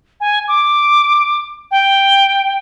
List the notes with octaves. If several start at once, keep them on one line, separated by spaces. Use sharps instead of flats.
G#5
D6
G5